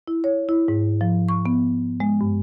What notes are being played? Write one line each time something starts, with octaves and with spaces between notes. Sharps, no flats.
E4
C#5
E4
G#2
F3
C#6
B3
G#3
G2